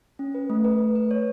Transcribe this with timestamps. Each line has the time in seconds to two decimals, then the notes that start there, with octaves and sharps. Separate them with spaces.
0.19 C#4
0.34 B4
0.50 A3
0.64 B4
0.79 A3
0.95 B4
1.11 C#5